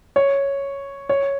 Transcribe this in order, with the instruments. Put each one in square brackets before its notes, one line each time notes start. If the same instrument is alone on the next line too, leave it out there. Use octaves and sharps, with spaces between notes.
[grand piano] C#5
C#5